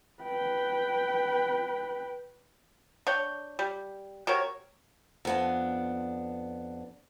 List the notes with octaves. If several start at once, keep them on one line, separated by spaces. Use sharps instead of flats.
B4 G5
D4 C#5 G5
G3
C3 F#4 A#4 C#5
F2 B3 D4